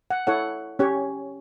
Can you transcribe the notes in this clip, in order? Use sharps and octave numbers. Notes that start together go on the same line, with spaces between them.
F#5
E4 A4 C#5 F#5
C#4 G4 C#5